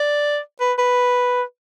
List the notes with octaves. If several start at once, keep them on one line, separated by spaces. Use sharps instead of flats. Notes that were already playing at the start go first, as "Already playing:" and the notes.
Already playing: D5
B4
B4